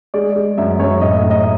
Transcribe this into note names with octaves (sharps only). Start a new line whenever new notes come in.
G#3 D5
G#3
F#2 E5
F#2 C#5
A2 D#5
E5
A2
D#5